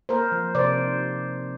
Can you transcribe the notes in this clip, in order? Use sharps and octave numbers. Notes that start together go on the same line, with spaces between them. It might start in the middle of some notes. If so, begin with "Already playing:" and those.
A#3 A#4 C5
F3
C3 C5 D5
D#4